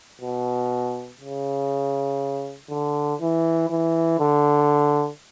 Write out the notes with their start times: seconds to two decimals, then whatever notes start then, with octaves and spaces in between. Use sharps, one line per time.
0.21 B2
1.21 C#3
2.70 D3
3.21 E3
3.70 E3
4.20 D3